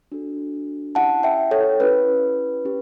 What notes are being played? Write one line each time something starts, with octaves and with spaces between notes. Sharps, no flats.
D4 F#4 A4
C#4 E4 G4 F#5 A5
E5 G5
A4 C#5
C#4 E4 G4 B4
C#4 G4